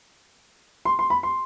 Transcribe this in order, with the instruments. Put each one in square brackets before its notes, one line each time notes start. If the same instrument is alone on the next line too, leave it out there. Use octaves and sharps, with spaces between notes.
[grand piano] C6
C6
B5
C6